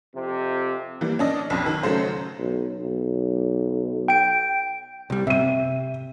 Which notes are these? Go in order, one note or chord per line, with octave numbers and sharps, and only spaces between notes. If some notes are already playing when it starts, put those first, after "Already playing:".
F2 C3
E3 G3 A#3
C#4 D4 D#5
B1 F2
D#3
C#3 F#3 A3 C5
B1
B1
G5 D7
C2 G3
C3 E5 D#7